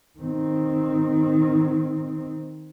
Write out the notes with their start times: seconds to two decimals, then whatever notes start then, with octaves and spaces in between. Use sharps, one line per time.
0.19 D#3 C4